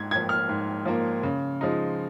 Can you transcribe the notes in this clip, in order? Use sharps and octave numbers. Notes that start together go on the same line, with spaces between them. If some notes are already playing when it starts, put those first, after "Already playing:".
Already playing: G#2 G#6
F3 A#3 G#6
F6
G#2
F3 A#3
C#3
F3 G#3 D#4